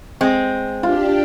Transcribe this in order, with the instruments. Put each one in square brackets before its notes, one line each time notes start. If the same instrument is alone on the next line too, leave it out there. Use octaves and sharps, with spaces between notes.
[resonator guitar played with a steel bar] G#3 C4
[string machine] D4 G4 [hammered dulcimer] F4